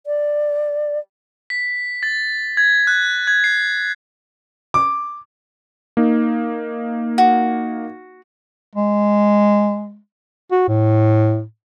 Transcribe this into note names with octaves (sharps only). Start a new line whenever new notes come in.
D5
B6
A6
G#6
F#6
G#6
C7
D6
A#3 D#4
F#4
G#3
F#4
A2